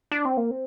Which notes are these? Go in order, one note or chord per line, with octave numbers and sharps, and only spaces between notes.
D4
C4
A#3
C4